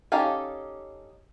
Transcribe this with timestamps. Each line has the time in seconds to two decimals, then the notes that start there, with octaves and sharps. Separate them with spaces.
0.12 C#4 D#4 G4 A4 F5